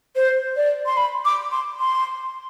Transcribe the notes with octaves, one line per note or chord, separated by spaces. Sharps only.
C5
D5
C6
B5
D6
C6
C6